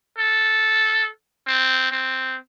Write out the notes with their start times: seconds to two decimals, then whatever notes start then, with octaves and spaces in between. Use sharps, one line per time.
0.18 A4
1.47 C4
1.91 C4